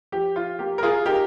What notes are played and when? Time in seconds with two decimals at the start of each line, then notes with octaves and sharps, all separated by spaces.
0.12 F3 G4
0.36 F4
0.59 A#3 G4
0.78 A#4
0.83 F4 G#4
1.05 D#4 G4 A#4